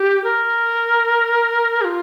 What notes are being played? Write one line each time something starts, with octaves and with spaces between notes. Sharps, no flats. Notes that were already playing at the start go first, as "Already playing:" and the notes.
Already playing: G4
A#4
G4
F4